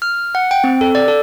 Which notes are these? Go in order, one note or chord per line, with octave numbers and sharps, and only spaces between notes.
F6
F#5
G5
C4
A4
D5
A4